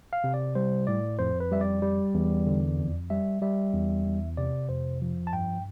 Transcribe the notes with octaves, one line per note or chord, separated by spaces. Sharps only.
F5
C3
D5
G3 C5
A2 D5
F2 C5
B4
G3 E5
D5
G3
E2
D3
F2
G3 E5
G3 E5
E2
E2
C3 D5
F2 C5
F3
A5
G2 G5